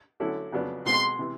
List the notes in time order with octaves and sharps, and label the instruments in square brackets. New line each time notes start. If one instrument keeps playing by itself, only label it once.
[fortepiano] D3 F#3 A3 C#4 E4
F2 C#3 F#3 B3 D4
[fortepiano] B1 B2 G#3 C4 [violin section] C6
[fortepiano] C3 E3